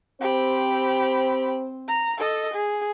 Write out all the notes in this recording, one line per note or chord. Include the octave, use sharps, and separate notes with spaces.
C4 G4 C5 B5
A#5
A4 D#5
G#4